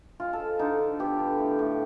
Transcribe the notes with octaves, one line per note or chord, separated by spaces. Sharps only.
G#3 F4
A4
F3
D3 D#4
D3
B3 G4
D3
A2
A2